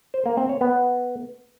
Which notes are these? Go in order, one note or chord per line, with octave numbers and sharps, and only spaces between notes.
C5
A#3
C4
C#5
B3